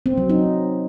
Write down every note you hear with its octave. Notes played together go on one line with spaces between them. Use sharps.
C4
F#3
D#4